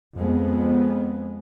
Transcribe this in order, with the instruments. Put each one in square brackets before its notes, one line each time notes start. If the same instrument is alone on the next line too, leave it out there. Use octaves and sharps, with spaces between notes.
[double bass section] F2 G#3 B3